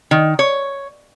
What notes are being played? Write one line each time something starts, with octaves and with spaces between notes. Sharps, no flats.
D#3
C#5